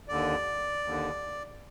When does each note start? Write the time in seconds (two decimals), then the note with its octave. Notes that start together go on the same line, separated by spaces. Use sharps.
0.09 D#2 D3 D5
0.84 D#2 D3